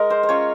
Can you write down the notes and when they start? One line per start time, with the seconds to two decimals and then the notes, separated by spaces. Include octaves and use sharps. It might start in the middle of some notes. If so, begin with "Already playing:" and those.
Already playing: G#3 A#4
0.10 C5
0.23 C5
0.29 C#4 F4 C#5